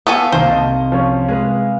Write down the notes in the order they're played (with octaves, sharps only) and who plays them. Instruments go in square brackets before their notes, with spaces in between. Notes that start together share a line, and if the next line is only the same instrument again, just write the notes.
[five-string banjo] B3 A4 G#5 [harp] F5 C#6
[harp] C2 [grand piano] D#3 A#3 [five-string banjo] C5
[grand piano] D#5 A5
F3 C#4
[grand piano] G#3 [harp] G#4 B4 F5